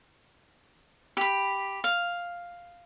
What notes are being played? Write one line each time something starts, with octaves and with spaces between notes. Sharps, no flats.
G4 B5
F5